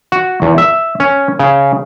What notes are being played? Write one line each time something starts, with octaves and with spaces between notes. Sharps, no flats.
F#4
E2
E5
C#4
C#3